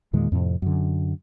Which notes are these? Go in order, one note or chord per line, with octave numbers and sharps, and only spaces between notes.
E2 A#2 D#3 G#3
F2 A2 C3
F#2 D3